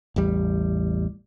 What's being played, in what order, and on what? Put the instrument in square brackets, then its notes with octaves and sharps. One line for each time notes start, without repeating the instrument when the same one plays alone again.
[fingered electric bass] A1 E2 G3